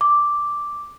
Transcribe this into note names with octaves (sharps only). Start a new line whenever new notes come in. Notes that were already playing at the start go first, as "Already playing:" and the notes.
D6